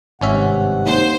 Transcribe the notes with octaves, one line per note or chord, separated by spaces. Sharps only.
G#1 G2 C3 C#4 E5 F#5
D#2 C5